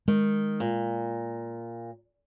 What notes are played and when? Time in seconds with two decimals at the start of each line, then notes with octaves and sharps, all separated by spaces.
0.08 D#3 G#3
0.60 A#2